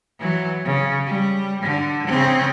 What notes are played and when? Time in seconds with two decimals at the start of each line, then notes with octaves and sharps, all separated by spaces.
0.19 E3 F#3
0.65 C#3
1.06 G3
1.63 D3
2.07 C#3 C4